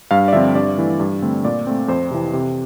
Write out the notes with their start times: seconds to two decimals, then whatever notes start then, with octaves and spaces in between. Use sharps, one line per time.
0.11 G2 F5
0.28 D5
0.33 D3 F3 C4 E5
0.55 G2 D5
0.78 E3 A3
1.00 G2
1.22 D3 A3 C4
1.45 A#2 D5
1.67 A3 C4
1.88 F2 C5
2.11 C3 E3
2.33 C3